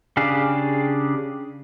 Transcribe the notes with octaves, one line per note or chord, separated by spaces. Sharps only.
C#3 D4 G4 G#4 F5